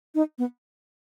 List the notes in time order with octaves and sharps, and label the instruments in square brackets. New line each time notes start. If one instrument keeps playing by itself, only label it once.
[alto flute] D#4
B3